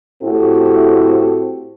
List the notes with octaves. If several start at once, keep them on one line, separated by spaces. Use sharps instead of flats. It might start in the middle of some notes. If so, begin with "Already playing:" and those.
A2 C4 E4 F#4 G4 A4